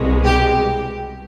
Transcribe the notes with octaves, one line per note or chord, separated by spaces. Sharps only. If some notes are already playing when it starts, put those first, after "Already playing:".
Already playing: C2 B2 G#3
G4